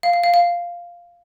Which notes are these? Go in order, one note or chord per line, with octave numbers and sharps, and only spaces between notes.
F5
F5
F5
F5